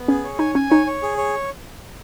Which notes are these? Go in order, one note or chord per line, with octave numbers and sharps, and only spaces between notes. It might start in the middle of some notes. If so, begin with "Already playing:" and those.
Already playing: B3
C#4 G#4
C#5
D#4 G#5
C#4 G#5
D#4 C#5
C#5
G#4
C#5